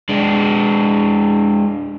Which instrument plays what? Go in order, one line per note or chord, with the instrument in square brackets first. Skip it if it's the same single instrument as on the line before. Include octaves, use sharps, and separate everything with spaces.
[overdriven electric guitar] G#3 D4